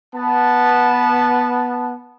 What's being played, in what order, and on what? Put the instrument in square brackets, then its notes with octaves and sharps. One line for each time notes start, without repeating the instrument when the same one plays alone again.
[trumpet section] B3 A5